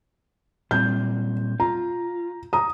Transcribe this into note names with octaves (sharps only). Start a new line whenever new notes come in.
A#2 G3 C4 G6
F4 A#5
A#5 D#6